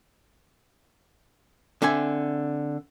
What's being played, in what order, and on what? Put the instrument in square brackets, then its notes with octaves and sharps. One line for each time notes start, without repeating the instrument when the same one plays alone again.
[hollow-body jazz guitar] D3 C4 E5 G#5